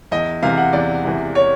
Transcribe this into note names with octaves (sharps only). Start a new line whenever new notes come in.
E2 D#5
C3 E3 F5
F#5
E2 D5
C3 E3
C#5